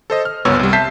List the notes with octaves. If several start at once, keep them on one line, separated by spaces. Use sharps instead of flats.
A4 C5 D#5
F6
G1 C#2 F#2 B3 C#5 E6
C2 G3
E5 A5 G6 B6 C7